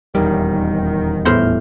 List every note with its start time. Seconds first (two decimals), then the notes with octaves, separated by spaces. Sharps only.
0.15 D#1 E2 D#3 G3
1.25 A2 B3 E4 C5 C6 F6